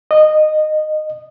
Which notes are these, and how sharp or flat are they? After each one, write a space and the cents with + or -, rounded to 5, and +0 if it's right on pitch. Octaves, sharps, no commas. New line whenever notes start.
D#5 -15